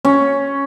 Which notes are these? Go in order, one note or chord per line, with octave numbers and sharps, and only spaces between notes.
C#4